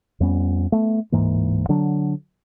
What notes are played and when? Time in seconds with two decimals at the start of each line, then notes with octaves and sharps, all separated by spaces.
0.20 F2 G3 B3 C#4
0.72 A3 B3
1.12 D1 G#2 E3 A#3
1.69 D3 F#3 D4